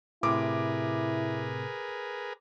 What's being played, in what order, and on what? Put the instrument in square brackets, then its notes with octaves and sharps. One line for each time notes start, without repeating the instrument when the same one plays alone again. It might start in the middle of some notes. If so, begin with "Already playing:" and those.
[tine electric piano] A2 C3 [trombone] E4 [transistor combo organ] G#4 A#4 B4 [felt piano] D6